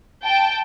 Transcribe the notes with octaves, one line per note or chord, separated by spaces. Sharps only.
G5 A5